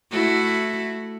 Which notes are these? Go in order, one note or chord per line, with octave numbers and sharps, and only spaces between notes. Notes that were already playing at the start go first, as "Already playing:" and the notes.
A3 E4 F#4